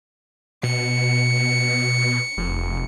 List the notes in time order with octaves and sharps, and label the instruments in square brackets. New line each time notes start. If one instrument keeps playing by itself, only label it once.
[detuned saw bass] B2 [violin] C#7
[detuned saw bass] F1